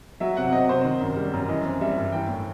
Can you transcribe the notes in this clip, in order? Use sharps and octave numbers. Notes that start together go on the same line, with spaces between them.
F#3 E5
C3 F#5
C4 D#5
C3 C5
D#3
F#2
G3
F#2
E3 D#5
C4
G3 E5
G2
E3 G5
A2